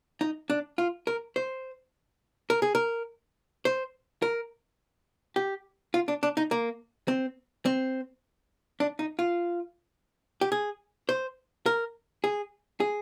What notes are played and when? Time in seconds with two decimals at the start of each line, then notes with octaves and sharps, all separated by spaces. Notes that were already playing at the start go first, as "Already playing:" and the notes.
0.21 D#4
0.50 D4
0.78 F4
1.07 A#4
1.36 C5
2.50 A#4
2.62 G#4
2.75 A#4
3.65 C5
4.22 A#4
5.36 G4
5.94 F4
6.08 D4
6.23 D4
6.37 D#4
6.51 A#3
7.08 C4
7.66 C4
8.80 D4
8.99 D#4
9.19 F4
10.41 G4
10.52 G#4
11.09 C5
11.66 A#4
12.24 G#4
12.80 G#4